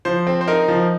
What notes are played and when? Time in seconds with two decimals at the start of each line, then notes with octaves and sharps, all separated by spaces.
0.05 F3 C5
0.27 C4
0.41 C5
0.48 D#4 A#4
0.68 F3